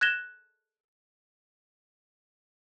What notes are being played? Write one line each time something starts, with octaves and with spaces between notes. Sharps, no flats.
F#6 G#6 A#6 E7 G7